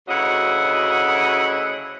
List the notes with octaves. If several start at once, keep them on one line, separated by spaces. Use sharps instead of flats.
D2 C#3 F#3 E4 D#5 F#5